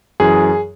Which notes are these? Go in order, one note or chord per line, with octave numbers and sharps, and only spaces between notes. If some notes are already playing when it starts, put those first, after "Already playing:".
F#2 E3 G#4